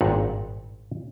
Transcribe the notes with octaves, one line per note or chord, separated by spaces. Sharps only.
G#1 G2 A#2 D4 D#4 F#5